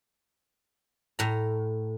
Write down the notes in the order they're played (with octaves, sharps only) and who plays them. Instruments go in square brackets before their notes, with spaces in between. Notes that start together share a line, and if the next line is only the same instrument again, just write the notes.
[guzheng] A2 A#5